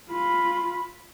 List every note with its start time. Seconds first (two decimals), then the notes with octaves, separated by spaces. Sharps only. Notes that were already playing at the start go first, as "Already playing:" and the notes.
0.10 F4 B5